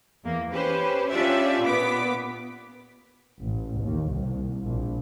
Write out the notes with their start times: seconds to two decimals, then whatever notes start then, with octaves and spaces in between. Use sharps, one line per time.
0.24 E2 A#3
0.53 C#4 G4 B4 C5
1.10 C#4 D4 F4 G4 D5 E5
1.63 A#2 B3 D6 B6
3.42 A1
3.80 D#2
4.13 C2
4.65 A#1